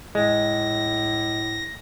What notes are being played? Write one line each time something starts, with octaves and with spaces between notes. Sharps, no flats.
A2 G#3 A#6